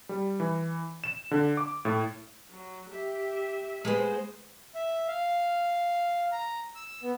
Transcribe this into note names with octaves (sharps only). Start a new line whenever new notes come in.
G3
E3
E7
D3
D6
A2
F#3
G4 E5
G#3 B3 C5
E5
F5
A#5
E6
B3